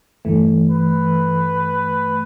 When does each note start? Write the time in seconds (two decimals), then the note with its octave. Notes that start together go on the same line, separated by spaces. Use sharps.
0.25 G2 E3 A3
0.71 B4